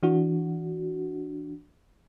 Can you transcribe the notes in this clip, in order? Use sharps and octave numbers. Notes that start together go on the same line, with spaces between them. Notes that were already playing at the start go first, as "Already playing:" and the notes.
E3 D4 F#4